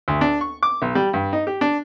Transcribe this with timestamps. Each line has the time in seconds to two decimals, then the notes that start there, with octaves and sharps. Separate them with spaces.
0.08 D2
0.21 D4
0.41 C#6
0.63 D6
0.82 B1
0.95 G3
1.14 G2
1.33 D#4
1.47 G4
1.61 D4